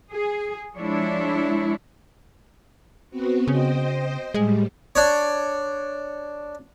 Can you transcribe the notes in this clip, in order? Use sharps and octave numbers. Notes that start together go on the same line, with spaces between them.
G#4
F3 G#3 D4 E4 C#5
B3 C4 F#4
C#3 C5 D#5 G5
A2 G3 G#3
D4 C#5